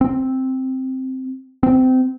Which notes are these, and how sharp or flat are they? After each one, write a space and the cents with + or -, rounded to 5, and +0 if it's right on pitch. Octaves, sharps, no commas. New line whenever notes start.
C4 +0
C4 -25